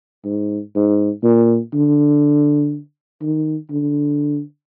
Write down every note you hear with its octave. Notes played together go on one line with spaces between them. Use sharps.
G#2
G#2
A#2
D3
D#3
D3